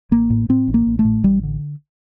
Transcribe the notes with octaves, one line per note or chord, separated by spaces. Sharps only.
A1 A#3
A2
A2 C4
A1
A#3
A1
A3
A2
A1 G3
D3